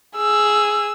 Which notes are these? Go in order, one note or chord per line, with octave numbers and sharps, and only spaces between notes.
G#4 E6